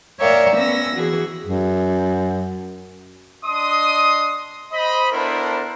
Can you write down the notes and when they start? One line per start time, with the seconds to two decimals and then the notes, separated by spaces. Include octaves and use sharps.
0.20 A#4 C#5 D5 E5 F5 G5
0.56 B3 C#4 E6 A#6
0.96 E3 F#4 G#4
1.46 F#2
3.46 D4 D#5 C6 D#6
4.73 C5 D#5 B5
5.12 B3 D4 E4 A4 A#4 C5